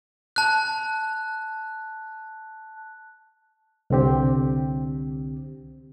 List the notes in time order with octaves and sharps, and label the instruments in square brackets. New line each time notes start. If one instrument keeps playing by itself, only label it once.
[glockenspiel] A5 F#6
[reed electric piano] C2 D3 C4 G4